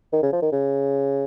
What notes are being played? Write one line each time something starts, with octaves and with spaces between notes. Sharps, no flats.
D#3
C#3
F3
D#3
C#3